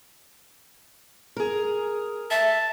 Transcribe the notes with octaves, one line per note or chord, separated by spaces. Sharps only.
G#4 A#4
E5 A5